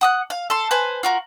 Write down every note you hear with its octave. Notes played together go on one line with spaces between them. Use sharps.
F#5 D#6 F#6
F5
A4 C6
B4 C5 G#5
F4 F#4 A#4